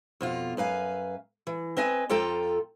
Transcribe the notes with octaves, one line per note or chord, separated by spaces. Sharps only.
F2 B2 F4
F#2 B4 F5 G#5
E3
C4 B4 D#5 G#5
F2 F4 A4 G5 A#5